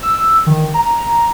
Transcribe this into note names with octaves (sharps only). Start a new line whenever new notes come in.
E6
D#3
A#5